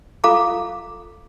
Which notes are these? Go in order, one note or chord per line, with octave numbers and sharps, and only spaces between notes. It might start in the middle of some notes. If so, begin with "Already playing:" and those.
F4 A4 F5 A#5 D6